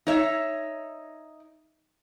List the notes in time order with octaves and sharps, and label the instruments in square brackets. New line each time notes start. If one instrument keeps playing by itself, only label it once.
[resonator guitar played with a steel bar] D#4 C#5 E5